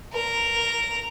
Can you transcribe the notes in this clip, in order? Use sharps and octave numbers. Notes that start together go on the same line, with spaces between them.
A#4